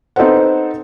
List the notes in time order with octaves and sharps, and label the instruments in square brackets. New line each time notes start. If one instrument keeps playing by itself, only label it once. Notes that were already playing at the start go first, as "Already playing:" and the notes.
[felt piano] C4 D#4 A4 B4 C5 F#5